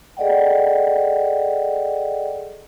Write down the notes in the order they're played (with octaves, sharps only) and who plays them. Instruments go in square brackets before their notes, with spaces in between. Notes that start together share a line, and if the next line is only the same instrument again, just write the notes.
[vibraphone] G#4 A4 D5 D#5 F#5 G5